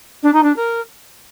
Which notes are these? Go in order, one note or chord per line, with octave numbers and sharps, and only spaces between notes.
D4
D#4
D4
A#4